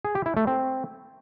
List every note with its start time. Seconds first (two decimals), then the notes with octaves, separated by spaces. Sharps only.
0.05 G#4
0.15 G4
0.26 E4
0.37 A3
0.47 C4